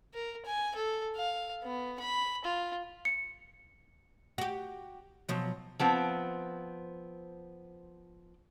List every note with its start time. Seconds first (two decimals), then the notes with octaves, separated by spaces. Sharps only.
0.14 A#4
0.45 G#5
0.76 A4
1.16 F5
1.63 B3
2.00 B5
2.45 F4
3.05 C#7
4.38 F#4 G4
5.29 B2 F3 F#3
5.80 F3 B3 C4